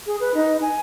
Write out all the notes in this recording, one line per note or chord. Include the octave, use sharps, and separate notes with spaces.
G#4
B4
D#4
G#5